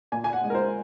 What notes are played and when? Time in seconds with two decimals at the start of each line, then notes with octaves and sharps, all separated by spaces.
0.12 A#2 G#5
0.24 G#5
0.33 F#5
0.44 G#3
0.50 A#4
0.55 C5